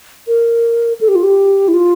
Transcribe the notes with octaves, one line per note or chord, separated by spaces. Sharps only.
A#4
A4
G4
F4
G4
E4
F4